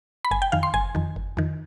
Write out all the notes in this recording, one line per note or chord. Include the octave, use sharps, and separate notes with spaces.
B5
G1 G#5
G5
F2 D#3 F5
C6
G1 G#5
F2 D#3
G1
F2 D#3